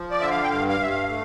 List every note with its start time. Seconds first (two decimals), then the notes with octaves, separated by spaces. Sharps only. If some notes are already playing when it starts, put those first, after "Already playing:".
Already playing: F3
0.11 D5
0.20 D3 E5
0.31 F5
0.43 G5
0.50 G2 F5
0.69 F5
0.80 G2 E5
0.89 F5
1.09 A3